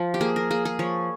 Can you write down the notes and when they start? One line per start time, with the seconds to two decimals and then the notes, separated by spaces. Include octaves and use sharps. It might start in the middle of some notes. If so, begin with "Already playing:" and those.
Already playing: F3
0.14 G4
0.21 A#3 G#4
0.36 A#4
0.51 A#3 G#4
0.65 G#4
0.79 F3 C#5